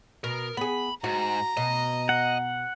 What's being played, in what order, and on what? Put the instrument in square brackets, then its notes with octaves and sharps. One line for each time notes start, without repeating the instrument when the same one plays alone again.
[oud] B2 [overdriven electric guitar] A#4
[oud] B3 G#4 [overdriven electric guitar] B5
[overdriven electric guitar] G#2 [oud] F#4 [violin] A#5
[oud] B2 [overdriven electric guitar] D#5
[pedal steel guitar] F#5